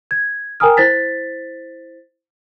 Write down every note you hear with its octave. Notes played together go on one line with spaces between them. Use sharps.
G#6
A#4 G5 G#5 A#5 D#6 F6
E4 C5 A6 B6